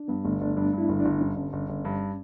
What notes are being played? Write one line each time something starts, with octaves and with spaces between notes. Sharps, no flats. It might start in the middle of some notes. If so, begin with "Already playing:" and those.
Already playing: D4
G2 B3
G1 A3
G1 D4
G2 D4
G2
E4
G1
G1 D4
G2 C#4
G1
G1
G1
G2